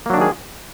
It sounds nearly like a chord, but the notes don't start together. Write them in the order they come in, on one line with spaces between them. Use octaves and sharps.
A#3 F#3 D4 D#3 G#4